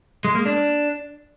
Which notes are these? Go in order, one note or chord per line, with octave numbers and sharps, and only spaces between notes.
G#3
A#3
D4